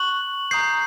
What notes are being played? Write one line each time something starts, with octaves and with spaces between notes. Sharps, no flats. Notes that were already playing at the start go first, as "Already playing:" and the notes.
Already playing: C#6 F#6 F#7
A#5 D#6 G6 C7